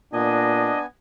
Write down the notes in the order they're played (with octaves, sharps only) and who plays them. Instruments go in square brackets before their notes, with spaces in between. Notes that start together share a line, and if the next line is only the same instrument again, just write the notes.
[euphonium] A#2 [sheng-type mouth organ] B3 G#5 [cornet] D4 [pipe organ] D#5